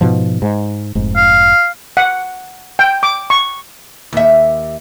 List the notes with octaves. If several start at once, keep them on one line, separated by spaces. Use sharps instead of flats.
G#2 B2 F3
G#2
F1 G#2
F5
F#5
G5
D6
C#6
D#2 E5